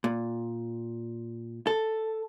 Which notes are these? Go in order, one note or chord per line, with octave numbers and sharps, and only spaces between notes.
A#2
A4